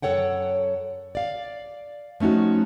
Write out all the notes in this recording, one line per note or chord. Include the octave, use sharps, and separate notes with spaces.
F#2 A3 A4 C#5 F#5 G5
D5 F5
F3 A3 C#4 D#4 F#4